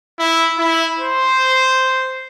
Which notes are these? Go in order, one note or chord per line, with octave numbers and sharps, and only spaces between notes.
E4
E4
C5